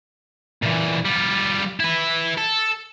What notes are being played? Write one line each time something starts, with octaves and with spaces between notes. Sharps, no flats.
A#2 E3
G3 F4
E4 B4
A4